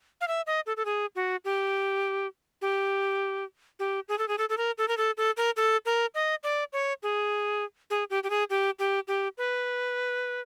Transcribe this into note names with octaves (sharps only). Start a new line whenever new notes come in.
F5
E5
D#5
A4
A4
G#4
F#4
G4
G4
G4
G#4
A4
G#4
A4
A4
A#4
A4
A#4
A4
A4
A#4
A4
A#4
D#5
D5
C#5
G#4
G#4
G4
G4
G#4
G4
G4
G4
B4